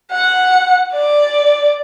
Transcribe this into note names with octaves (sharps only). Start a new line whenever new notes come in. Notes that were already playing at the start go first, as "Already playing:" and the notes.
F#5
D5